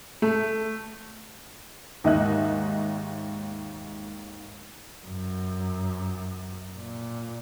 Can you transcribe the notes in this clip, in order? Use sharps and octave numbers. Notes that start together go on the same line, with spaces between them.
A3
D#2 G#2 D#5 E5 F#6
F#2
A#2